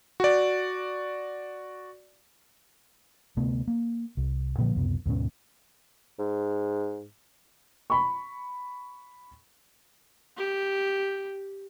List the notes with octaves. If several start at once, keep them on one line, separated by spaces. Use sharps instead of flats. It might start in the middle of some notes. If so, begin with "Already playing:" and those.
F#4 D5
D2 C3 A3 B3
A#3
C2
A#2 D3 F3 A#3
C#2 F#2 C3 B3
D2 G#2 B2 C#4
G#2
B5 C#6
G4